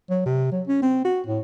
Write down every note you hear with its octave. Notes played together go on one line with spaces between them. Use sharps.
F#3
C3
F#3
C#4
C4
F#4
A2